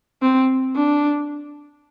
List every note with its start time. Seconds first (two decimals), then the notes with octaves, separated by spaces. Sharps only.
0.22 C4
0.76 D4